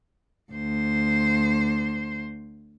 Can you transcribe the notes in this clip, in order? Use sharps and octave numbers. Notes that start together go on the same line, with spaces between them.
D2 C5